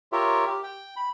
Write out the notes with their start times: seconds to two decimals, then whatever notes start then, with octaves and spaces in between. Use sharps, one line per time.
0.12 F4 G4 A#4 C#5 E5
0.47 G4
0.63 G5
0.96 B5